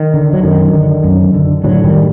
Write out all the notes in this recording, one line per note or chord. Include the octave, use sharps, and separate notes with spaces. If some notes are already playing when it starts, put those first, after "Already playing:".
Already playing: D#3
D3
F#3
F#2 D#3
D3
F#2
D3
A2 D3 F#3
D#3 G3